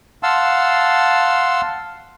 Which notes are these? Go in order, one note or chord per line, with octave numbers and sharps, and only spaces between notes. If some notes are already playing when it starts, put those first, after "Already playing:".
F5 F#5 A5 C6 E6